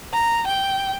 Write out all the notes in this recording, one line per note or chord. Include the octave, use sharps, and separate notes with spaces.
A#5
G5